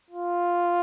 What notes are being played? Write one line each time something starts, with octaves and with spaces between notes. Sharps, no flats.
F4